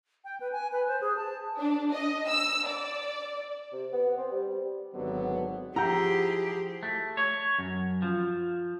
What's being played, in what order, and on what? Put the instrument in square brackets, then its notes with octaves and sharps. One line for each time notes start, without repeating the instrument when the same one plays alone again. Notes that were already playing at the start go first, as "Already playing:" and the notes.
[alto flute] G5
B4
G#5
B4
C5
G#4
A5
[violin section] D4
D#5
E6
D5
[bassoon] C3
B3
C4
G3
[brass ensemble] G#1 D3 F#3 B3
[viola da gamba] F3 G#4 [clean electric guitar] E4 F#5 G5 [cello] G4 [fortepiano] A#5
[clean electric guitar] A3
C#5
F#2
F3